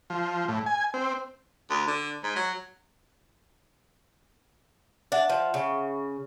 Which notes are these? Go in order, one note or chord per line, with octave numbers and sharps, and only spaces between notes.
F3
A2
G#5
C4
D2
D3
G#2
F#3
D4 E5 F#5
F3
C#3